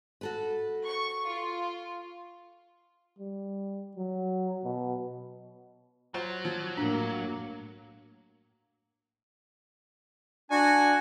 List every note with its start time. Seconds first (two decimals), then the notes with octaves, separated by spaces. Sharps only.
0.21 F#4 A4 B4
0.85 C#6
1.28 F4
3.19 G3
3.96 F#3
4.64 B2
6.14 F#3 F4 F#4 C5
6.45 F3
6.77 A2 A#3 D4
10.51 D4 F#4 G#5